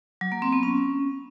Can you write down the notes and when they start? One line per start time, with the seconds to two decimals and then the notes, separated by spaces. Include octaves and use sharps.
0.21 F#3
0.32 A#3
0.42 C4
0.53 B3
0.63 C#4